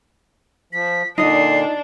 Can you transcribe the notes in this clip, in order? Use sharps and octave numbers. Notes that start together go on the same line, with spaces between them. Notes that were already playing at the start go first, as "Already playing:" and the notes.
F3 B6
A#2 D3 D4 D#4 D#5 C7